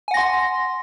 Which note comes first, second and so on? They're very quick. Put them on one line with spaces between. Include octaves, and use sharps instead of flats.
G#5 F#5 A#6 C6